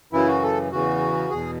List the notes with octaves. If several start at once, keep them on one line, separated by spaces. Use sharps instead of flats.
F#2 C#3 E3 E4
F#4
A4
E2 C#3 E3 F#4
E2 B2 G#4